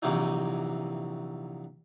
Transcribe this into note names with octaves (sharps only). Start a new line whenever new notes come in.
A#1 C3 E3 F#3 D#4